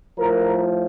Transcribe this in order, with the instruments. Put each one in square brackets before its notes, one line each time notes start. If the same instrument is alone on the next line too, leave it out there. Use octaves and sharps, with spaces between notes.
[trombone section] A2 F3 A#4